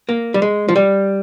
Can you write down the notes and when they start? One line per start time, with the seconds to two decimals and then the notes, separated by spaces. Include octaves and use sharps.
0.09 A#3
0.34 G3
0.42 G#3
0.68 F3
0.76 G3